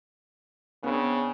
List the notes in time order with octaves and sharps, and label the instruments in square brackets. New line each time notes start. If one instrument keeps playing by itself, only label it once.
[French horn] C#3 [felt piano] B3 C4 D4